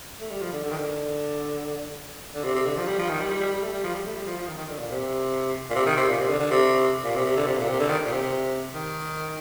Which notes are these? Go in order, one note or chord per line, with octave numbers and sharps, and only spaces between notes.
A3
G3
F3
D3
D3
D#3
D3
D3
C3
C3
D3
F3
G3
F3
D#3
G3
G3
G3
G3
A3
G3
F3
G3
A3
G3
F3
F3
D#3
D#3
D3
A#2
C3
A#2
C3
D#3
C3
A#2
C3
D3
D3
C3
A#2
C3
C3
D3
C3
A#2
C3
D3
D#3
A#2
C3
C3
D#3